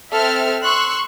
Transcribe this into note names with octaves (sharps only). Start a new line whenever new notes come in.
C4 A4 E5 F6
C6 C#6 E6 F#6